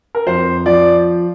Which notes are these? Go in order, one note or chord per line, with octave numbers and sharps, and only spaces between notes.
A#4
F2 C5
F3 D5